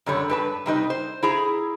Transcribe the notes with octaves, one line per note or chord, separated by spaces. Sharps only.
F#2 D3 G3 C#5
G2 B4 A5
C3 G3 D#4 B4
C5
E4 G#4 A#5